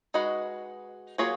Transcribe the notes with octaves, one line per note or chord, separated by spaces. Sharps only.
G#3 D#4 F#4 B4 D#5
F#3 A#3 F4 G#4 C#5